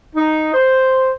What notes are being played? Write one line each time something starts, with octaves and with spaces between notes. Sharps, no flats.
D#4
C5